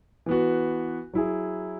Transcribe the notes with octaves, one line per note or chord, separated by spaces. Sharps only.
E3 B3 F#4
F#3 E4 G#4